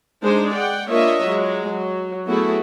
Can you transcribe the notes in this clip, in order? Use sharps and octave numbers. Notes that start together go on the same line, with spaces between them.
G#3 D4 D#4 C5
D5 F#5 G5
A#3 D4 F4 C#5 D#5 E5
F#3 G#3
F#3
F#3 A3 B3 E4 F#4 G#4